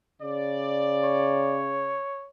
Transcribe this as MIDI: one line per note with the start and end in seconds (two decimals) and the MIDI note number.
0.22 2.01 49
0.22 1.61 74
1.03 2.27 73